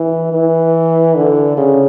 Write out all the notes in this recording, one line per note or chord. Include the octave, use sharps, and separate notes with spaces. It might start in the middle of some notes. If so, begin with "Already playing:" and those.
Already playing: E3
E3
D3
C#3